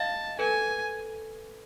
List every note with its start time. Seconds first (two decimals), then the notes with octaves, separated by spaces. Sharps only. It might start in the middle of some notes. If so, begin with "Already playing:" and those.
Already playing: D#5 F5 A5
0.39 A4 B4 G#5